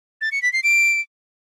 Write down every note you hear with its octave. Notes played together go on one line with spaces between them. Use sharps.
A6
C#7
B6
C7
D7